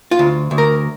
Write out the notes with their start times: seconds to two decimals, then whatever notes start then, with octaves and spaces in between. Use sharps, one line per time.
0.11 F4
0.19 D2
0.51 D2
0.58 A#4